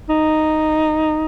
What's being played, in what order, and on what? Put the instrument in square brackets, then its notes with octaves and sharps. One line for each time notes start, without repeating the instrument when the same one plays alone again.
[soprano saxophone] D#4